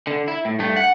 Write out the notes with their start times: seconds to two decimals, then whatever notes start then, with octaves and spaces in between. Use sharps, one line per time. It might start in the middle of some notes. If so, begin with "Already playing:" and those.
0.07 D3
0.28 E4
0.45 A2
0.59 G2 A3
0.76 F#5